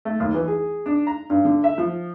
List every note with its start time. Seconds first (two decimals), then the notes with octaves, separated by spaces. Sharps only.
0.05 A3
0.20 D#2
0.34 E3
0.48 G#4
0.86 D4
1.07 A#5
1.30 G2
1.45 D3
1.64 E5
1.78 F3